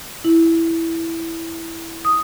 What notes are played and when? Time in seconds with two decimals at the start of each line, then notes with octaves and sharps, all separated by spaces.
0.25 E4
2.05 D#6